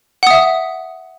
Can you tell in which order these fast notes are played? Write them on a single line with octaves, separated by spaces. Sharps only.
F#5 D#6 E5